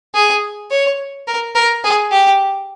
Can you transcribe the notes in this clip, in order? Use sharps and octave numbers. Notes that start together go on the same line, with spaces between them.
G#4
C#5
A#4
A#4
G#4
G4